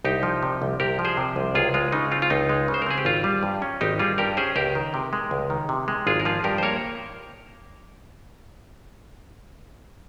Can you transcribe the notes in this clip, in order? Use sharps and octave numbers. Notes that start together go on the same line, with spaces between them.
C2 D#4 G4
F3
C3
C2
C2 G4 A#4
F3
G#4 C5
C3
C2
C#2 F4 G#4
G#3 F4
C#3 D#4
C4 F4
F4
C#2 D#4
G#3
C#3
C5
A#4
C4 G#4
G4
G#1 F4
G3
G2
C#4
G#1 D#4 G4
G3 F4 G#4
G2 G4 A#4
C#4 G#4 C5
C#2 G4 A#4
D#3
C3
G#3
C#2
D#3
C3
G#3
G#1 F4 G#4
A#4
F3 F4 G#4
G2 G4 A#4
C5
A#3 A#4 C#5